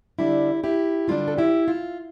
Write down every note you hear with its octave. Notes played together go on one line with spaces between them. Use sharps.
D3 G3 D4 E4 G4
E4 G4
D3 G3 D4 F4
A4
E4 G4
F4